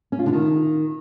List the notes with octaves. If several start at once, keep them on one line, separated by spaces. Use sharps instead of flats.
C#4
F4
D3
D#3